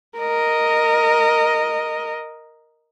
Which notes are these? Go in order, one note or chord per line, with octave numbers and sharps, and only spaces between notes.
A#4 D#5